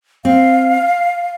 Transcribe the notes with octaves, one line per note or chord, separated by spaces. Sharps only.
C4 F5